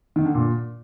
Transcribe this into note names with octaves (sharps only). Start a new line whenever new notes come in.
D#3
D3
A#2